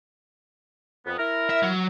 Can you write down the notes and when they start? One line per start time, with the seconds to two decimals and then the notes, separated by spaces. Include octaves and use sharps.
1.06 F2 B3
1.18 E4 A#4
1.50 E5
1.63 F#3